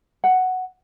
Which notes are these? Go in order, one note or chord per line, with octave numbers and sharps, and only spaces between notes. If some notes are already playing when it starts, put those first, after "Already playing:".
F#5